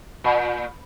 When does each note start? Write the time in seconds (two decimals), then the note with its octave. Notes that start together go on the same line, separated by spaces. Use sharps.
0.24 A#2